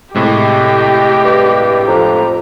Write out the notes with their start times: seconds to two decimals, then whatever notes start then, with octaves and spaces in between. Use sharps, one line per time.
0.15 A2 C3 G#3 G4 D#5
1.24 G2
1.87 F2 A#5